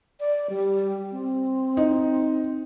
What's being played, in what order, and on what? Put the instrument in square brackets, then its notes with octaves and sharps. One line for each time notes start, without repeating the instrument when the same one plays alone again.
[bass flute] D5
G3
C4
[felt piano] D#4